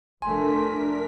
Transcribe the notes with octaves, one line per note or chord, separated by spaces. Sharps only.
F1 A3 D4 A#4 G#5 C6 B6